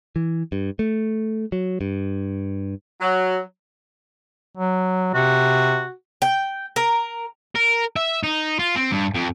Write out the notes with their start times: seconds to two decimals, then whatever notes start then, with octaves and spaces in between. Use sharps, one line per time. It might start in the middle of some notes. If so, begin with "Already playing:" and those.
0.16 E3
0.52 G2
0.79 A3
1.52 F#3
1.81 G2
3.01 F#3
4.57 F#3
5.14 C3 F#4
6.22 G5
6.76 A#4
7.55 A#4
7.96 E5
8.23 D#4
8.59 F4
8.76 C4
8.91 G2
9.14 F2